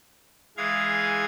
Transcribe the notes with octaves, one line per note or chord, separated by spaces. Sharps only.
E3 G#3 G#4 F5 G#6